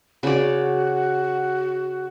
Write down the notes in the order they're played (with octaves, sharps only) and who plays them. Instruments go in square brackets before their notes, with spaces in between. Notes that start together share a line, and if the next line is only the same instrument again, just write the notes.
[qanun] C#3 D5 [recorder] F#4